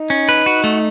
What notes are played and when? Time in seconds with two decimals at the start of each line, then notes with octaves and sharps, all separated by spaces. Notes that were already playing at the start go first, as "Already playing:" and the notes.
Already playing: D#4
0.10 C#4
0.29 B4
0.46 F#4
0.64 A3